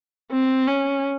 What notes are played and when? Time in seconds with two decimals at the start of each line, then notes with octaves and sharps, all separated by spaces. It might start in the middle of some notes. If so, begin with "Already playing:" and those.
0.32 C4
0.67 C#4